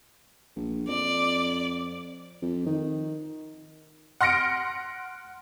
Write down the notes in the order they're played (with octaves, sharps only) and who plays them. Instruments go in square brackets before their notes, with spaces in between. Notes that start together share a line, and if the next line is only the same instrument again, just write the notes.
[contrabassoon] A#1
[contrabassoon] F2 [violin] D5
[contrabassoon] F2
D#3
[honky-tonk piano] F#5 C6 F6 A#6 C#7 D7